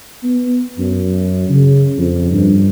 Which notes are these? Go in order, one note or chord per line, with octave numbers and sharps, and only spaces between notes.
B3
F#2
C#3
F2
G2